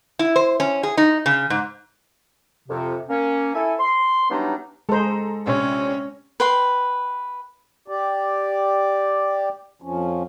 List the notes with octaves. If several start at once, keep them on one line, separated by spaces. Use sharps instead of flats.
E4
C5
C#4
G#4
D#4
C#3
G#2
F2 C3
A#3 C#4
E4 A4 G#5
C6
E3 F#3 G3 B3 D4 D#4
G#3 A4 C5 A#5
A#1 C3 C#4 C#5
B4 G5 C6
G4 D5
F2 F3 C#4